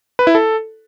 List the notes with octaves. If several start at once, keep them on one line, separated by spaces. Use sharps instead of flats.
B4
E4
A4